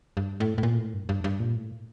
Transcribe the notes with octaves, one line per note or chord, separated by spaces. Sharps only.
G2
A2
A2
A#2
A2
G2
G2
G2
A#2
A2